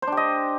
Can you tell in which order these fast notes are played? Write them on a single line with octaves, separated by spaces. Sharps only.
C5 D4 G4 D#5